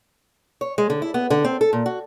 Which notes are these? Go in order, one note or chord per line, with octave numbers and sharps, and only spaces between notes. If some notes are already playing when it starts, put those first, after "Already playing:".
C#5
G#3
D3
E4
B3
D3
C4
A4
A#2
F#4